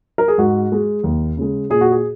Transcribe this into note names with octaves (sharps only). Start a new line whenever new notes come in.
A#4
G#4
G#2 F#4
G#3
D#2
C#3 G#3
A#2 G#4
F#4
G#4